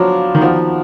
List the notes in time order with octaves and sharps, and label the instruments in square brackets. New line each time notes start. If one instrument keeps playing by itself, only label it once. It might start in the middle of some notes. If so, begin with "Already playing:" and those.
Already playing: [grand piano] F3 F#3 [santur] B3 D4 F4
[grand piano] D#3
[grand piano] F3 [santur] B3 D#4 F#4